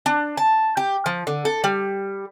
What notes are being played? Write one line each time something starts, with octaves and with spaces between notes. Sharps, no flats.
D4
A5
G4
F3
D3
A4
G3